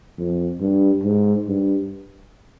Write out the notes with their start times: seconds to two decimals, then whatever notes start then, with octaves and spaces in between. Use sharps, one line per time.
0.18 F2
0.61 G2
1.04 G#2
1.48 G2